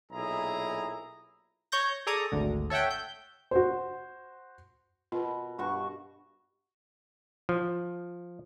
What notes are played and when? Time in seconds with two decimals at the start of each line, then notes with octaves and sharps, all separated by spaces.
0.11 B1 A#2 E4 G#4 A#5
1.72 C#5 C#6 G6 A#6
2.07 G#4 A4 D5 A#5 C#6 D#6
2.32 G#1 D2 D3
2.70 A4 C#5 E5 F#5 G5
2.90 G6
3.51 F#4 C5
5.12 B2 F4
5.58 G2 F#4 C#6
7.49 F3